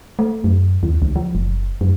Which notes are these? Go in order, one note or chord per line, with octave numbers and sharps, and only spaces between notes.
A3
F#2
D#2
C#2
F3
F#1
F#2